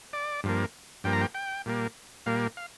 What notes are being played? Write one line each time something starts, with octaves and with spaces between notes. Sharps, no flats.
D5
G2 F3 A#3
G2 F3 A#3 G5
A#5
G5
G5
A#2 G3 A#3
A#2 G3 A#3 F5
F5